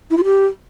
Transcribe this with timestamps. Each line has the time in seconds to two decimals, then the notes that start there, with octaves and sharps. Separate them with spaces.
0.10 E4
0.17 F4
0.24 G4